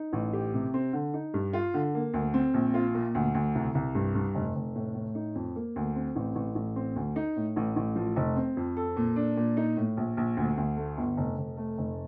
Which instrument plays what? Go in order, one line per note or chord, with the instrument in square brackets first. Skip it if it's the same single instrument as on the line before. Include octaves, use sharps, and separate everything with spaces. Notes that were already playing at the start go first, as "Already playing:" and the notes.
Already playing: [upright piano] D#4
A1
G4
C3
C4
D3
D#4
G2
F4
D3
A#3
D2
C4
A#1
F4
A#2
D2
D2
C2
C2
G2
G2
F1
F1
A2
A2
D#4
F2
A#3
D2
C4
A1
A1
A1
C4
D2
D#4
A2
A1
A1
F3
F1
C4
F2
A4
A#2
D4
A#2
D#4
A2
A#1
A#1
D2
D2
A3
G1
F1
F1
A3
F1